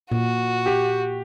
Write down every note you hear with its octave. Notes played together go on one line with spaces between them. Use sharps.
A#2 F#4
G4